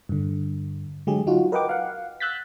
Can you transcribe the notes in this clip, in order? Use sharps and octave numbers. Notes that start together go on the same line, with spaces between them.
G2 D3
D3 F#3 G#3 G4 G#4
F#3 D#4 F4 F#4
A#4 B4 D#5 F#5 G5 D6
F5 F#5
E6 F#6 G6 A6 B6